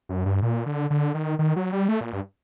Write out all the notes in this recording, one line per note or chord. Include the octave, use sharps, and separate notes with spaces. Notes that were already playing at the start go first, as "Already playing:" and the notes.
F#2
G2
A#2
D3
D3
D#3
D#3
F#3
G3
A3
A#2
G2